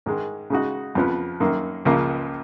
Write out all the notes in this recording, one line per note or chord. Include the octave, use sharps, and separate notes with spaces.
G#2 D#3 G#3
C#3 G#3 D#4 F#4
F2 C#3 F3 B3
F#2 D#3 A#3
C#2 C#3 F3 A#3